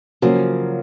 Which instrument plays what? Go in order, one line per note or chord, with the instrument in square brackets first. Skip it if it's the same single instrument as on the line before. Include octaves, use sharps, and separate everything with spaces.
[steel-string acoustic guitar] C#3 F3 A#3 [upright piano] F#3